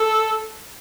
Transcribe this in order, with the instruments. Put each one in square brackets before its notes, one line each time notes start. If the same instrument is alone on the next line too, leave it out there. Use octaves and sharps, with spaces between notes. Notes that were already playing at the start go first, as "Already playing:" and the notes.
Already playing: [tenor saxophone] A4